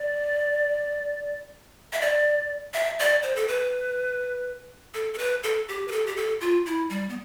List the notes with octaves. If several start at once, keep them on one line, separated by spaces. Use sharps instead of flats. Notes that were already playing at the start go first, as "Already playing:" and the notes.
Already playing: D5
E5
D5
E5
D5
C5
A4
B4
A4
A4
B4
A4
G4
B4
A4
G4
A4
F4
E4
G3
B3